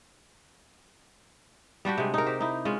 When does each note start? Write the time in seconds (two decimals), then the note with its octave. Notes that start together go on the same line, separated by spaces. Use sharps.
1.85 G3 D4 F#4 G4
1.98 C3 G#3
2.14 D#4 A#4
2.26 G4 C5
2.40 D#4 E4
2.65 G#3 C#4 F4